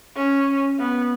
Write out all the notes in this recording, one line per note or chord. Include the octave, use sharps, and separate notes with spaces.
C#4
B3